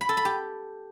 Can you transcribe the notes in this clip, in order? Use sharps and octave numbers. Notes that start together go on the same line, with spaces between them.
B5
A4
B5
G4